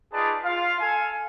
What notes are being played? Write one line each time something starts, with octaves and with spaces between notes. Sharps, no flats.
D#4 F4 G#4 B4 D5 A5
F4 F5
A4 F5 G#5